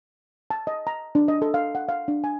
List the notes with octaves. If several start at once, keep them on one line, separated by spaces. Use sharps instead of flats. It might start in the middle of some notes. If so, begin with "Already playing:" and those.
A5
D#5
A#5
D4
D#5
A4
F5
F#5
F5
D4
G#5